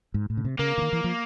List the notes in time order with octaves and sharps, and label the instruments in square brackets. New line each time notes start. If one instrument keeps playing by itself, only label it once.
[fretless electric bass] G#2
A2
C#3
C3
[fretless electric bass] C#3 [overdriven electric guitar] A#3
[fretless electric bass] D3
D#3
E3
F3